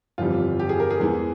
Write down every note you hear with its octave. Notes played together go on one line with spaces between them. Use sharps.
G1 F2 E3 G3 F4
G4
G#4
A#4
G#4
E2 E3 G#3